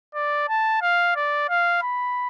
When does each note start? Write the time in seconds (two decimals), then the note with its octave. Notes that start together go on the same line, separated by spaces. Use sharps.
0.15 D5
0.49 A5
0.82 F5
1.16 D5
1.49 F5
1.82 B5